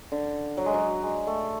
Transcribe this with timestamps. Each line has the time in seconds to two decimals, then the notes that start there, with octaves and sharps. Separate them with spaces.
0.12 D3
0.57 F#3
0.66 G#3
0.74 F#3
1.03 G#3
1.27 A3